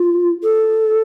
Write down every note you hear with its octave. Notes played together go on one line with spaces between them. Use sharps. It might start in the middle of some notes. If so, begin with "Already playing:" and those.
Already playing: F4
A4